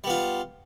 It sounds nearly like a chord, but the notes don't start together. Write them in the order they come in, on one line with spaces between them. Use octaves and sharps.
G3 B3 F4